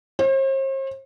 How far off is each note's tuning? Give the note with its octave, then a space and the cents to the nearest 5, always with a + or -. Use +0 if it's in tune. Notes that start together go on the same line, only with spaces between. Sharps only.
C5 +45